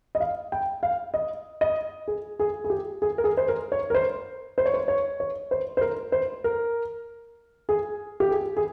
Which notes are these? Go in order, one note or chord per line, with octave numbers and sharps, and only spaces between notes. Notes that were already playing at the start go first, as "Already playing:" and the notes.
D#5
F5
G5
F5
D#5
D#5
G#4
G#4
G#4
G4
G#4
A#4
G#4
C5
A#4
C#5
A#4
C5
C5
C#5
C5
C#5
C#5
C5
C5
A#4
C5
A#4
G#4
G4
G#4
G#4